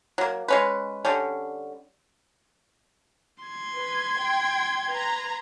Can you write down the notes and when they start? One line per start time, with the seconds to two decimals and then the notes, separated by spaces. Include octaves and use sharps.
0.18 F#3 A#3
0.48 G#3 C#4 B4
1.05 D3 G3 C#4
3.44 C6 G#6
3.76 B4
4.19 G5
4.90 B4 A#5